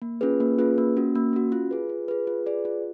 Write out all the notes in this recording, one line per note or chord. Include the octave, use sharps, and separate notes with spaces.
A#3
C#4 F4 G#4 B4
A#3
C#4 F4 G#4 B4
A#3
C#4 F#4
A#3
C#4 F#4
F4
G#4 B4
F4
G#4 B4
F4
G#4 B4 D5
F4